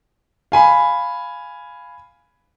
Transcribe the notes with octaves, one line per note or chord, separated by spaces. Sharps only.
F5 G#5 B5